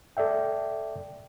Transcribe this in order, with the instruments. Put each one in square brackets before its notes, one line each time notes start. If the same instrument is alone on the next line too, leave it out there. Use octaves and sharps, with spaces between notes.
[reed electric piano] A4 D5 E5 G5